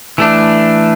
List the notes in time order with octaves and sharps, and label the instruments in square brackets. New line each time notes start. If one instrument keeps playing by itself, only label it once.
[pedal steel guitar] E3 A3 D4